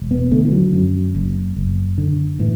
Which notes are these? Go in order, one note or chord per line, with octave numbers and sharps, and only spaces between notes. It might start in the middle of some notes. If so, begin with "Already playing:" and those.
Already playing: E1
B3
D3 A3
E3
F#3
F#2
F#1
F#1
D3
A2 E3